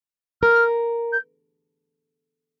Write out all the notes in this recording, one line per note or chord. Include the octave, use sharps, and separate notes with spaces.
A#4 F6
G6